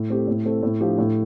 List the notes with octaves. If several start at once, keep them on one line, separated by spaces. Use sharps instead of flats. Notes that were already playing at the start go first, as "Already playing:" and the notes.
Already playing: A2
A3 C4 G4
A2
A3 C4 A4
A2
F3 D4 G4
A2